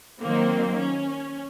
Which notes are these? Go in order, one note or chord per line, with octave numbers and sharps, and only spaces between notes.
D#3 F#3 A#3 C4
C#4